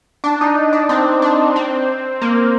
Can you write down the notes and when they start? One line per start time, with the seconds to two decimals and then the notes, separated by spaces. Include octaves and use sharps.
0.24 D4
0.41 D#4
0.73 D4
0.89 C4
1.22 D4
1.56 C4
2.21 A#3